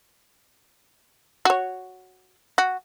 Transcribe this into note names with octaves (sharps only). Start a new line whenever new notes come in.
F#4 C#5
F#4